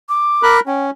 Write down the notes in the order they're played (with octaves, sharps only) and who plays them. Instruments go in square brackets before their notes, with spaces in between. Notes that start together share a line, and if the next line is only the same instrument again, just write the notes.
[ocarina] D6
[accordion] A#4 B5 F#6
[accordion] C#4 [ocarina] G5